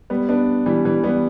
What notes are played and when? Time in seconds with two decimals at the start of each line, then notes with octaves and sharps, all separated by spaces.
0.10 G3 B3
0.29 B3 D4
0.66 E3 G3
0.85 E3 G3
1.04 G3 B3